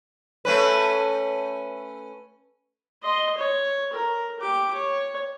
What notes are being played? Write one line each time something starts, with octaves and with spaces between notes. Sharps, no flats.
A3 C#4 B4
D#5 C6
C#5
A#4
G4 D6
C#5